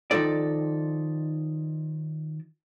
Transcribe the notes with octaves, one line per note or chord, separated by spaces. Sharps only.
D#3 F3 F#3 D#4 A4 D5